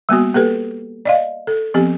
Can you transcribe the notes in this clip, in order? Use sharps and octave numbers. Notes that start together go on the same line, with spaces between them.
G3 A#3 B3 F#4
A#3 G4 A4 B4
D5 D#5 F5
A4
F3 B3 C4 G4